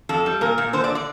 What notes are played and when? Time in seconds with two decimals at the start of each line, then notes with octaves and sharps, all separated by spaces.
0.09 F2 A4
0.26 G3
0.41 A#2 A#4
0.58 A#2
0.73 D3 C5
0.84 D5
0.95 D5